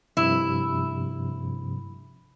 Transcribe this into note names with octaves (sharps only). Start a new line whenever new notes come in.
G2 C3 F3 E4